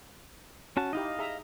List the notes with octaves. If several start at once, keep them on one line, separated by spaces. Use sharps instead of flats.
C#4 F#4 A5
D#4 E4 G4 D#5 F5
G#4 E5 A#5